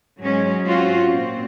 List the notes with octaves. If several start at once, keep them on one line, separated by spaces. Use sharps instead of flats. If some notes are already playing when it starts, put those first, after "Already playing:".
G#2 F#3 G#3 C#4
C4 C#4 F4 F#4
A#2 C4